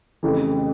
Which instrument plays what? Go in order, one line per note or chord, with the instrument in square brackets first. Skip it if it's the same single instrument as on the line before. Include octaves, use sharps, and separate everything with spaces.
[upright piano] F1 F2 C#3 E3